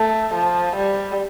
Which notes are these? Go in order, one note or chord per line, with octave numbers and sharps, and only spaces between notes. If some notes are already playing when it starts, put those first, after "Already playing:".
Already playing: A3
F3
G3